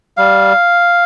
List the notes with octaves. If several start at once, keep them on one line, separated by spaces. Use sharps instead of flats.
G3 F5